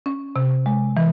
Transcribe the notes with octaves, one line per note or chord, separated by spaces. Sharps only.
C#4
C3
G#3
E3